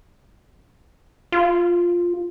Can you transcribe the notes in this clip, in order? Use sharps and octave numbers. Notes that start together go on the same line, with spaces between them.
F4